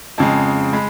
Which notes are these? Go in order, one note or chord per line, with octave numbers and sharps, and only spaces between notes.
F2 C#3 G#3 A5
G#3 B5